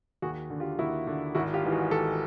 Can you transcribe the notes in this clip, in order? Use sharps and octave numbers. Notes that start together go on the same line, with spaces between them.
D#2 F#4 G#4
D3
F4 G4
D#2 E4 F#4
D3
G#1 E4 F#4
F4 G4
G#2 E3
F#4 G#4
G#1 G4 A4